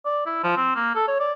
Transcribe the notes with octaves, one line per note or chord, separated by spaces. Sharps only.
D5
E4
F3
C4
A#3
A4
C#5
D5